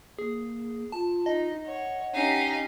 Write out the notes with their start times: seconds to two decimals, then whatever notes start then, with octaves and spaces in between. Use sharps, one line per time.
0.19 A#3 G#4
0.92 F4 A5
1.26 D#4 D#5
1.66 C#5 F#5
2.14 C#4 D#4 G4 F5